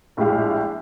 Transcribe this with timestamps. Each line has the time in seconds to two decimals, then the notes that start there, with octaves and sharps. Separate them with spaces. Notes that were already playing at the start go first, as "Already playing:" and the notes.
0.17 A#1 A2 G#3 G4 F5